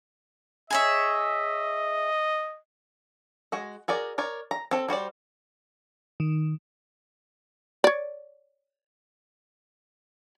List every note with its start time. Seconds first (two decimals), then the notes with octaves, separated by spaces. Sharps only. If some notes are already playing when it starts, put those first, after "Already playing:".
0.70 G#4 C#5 D#5 E5
3.52 G#3 F#4 D#5
3.88 F#4 G#4 A#4 D5
4.18 A#4 C#5 D5
4.51 A#5
4.71 C4 A4
4.88 G3 F#4 C5 D5
6.20 D#3
7.84 C#5 D5